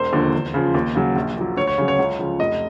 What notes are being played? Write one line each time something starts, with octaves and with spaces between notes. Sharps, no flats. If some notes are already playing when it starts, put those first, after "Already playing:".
Already playing: E1 C5
D#2 D3 F3
E2
C#3 F3
D#2
C#3 F#3
A#1
A#2 F#3
D2 C#5
C#5
C#3 F#3
C#5
C#2
C#3 F3
F1 D#5